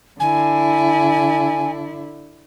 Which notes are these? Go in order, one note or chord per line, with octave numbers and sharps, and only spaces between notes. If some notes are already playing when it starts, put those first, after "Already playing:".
D3 E4 G#5